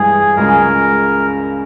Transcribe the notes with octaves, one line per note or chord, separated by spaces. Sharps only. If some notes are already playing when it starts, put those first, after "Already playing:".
Already playing: G2 E3 G#3 G#4
C#2 C#3 G#3 C#4 A#4